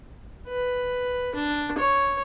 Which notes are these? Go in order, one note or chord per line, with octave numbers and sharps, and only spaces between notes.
B4
D4
C#5